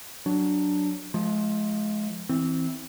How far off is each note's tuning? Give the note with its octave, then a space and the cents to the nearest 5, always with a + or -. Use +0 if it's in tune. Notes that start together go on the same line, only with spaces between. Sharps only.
F#3 +10 D4 +0
F3 +0 G#3 +35
E3 -15 C4 +0